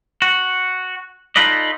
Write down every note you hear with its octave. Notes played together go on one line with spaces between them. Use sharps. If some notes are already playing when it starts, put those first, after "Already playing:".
F#4
D#4 F4 A4 B4 D5 D#5